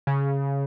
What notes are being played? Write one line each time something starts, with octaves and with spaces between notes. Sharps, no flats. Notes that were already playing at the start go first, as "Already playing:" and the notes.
C#3